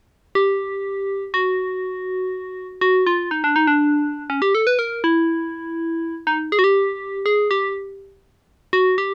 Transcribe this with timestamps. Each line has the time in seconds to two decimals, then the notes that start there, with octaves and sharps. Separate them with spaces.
0.35 G4
1.34 F#4
2.81 F#4
3.06 F4
3.31 D#4
3.44 D4
3.56 D#4
3.67 D4
4.30 C#4
4.42 G4
4.55 A4
4.67 B4
4.79 A#4
5.04 E4
6.27 D#4
6.52 G#4
6.59 F#4
6.64 G4
7.26 G#4
7.51 G4
8.73 F#4
8.98 G4